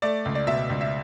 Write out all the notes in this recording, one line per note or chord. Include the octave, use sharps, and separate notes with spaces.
A3 D5
C#2
D5
B2 E5
C#2
E5